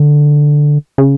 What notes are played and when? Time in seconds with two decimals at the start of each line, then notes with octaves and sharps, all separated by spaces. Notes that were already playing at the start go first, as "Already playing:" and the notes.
Already playing: D3
0.98 C#3